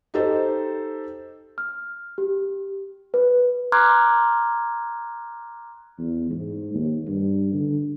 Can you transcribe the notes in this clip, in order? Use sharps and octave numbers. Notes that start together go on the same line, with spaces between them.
D#4 G4 A4 C5
F6
G4
B4
A#5 C6 D6 F6 F#6 G#6
E2
G#2
D#2
G2
D3